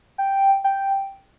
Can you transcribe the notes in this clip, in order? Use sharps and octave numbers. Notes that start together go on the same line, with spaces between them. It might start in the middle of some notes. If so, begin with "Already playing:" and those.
G5
G5